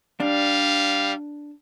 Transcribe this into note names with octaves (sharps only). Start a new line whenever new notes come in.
G3 D4 F5